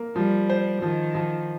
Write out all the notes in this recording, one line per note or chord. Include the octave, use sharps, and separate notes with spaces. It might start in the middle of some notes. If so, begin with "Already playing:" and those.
Already playing: A#3
F3 G3
C5
D#3 F3
F3